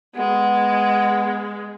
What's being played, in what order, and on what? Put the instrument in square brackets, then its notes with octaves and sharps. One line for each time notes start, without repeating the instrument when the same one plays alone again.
[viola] G#3 [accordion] B3